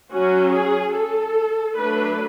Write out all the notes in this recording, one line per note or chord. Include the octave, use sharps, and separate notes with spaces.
F#3 C#4 F#4
G#4
A4
F#3 A3 D4 B4